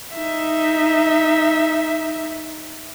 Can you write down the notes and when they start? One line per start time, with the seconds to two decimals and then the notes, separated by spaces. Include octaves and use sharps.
0.14 D#4 E5